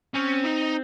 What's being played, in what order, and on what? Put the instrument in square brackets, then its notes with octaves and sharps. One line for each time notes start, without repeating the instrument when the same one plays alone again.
[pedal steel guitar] C4 [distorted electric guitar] C#4
[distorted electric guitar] D#4